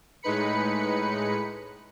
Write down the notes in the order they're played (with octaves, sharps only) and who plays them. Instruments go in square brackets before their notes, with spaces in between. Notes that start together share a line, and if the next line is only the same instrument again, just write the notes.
[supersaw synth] A2 G#3 D#4 B4 B5 C#7